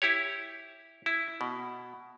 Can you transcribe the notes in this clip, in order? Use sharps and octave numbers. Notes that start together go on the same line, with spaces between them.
E4 G4 C#5
E4
B2